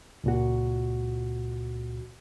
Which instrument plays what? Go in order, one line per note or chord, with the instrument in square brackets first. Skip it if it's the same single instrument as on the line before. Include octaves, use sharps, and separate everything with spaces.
[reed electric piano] C#2 A#2 F#4